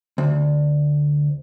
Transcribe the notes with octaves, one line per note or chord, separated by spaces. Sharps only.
D2